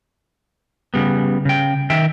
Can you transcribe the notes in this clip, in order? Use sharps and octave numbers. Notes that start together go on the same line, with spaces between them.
C#3 G3 B3
C#3 G5
D#3 E5 G5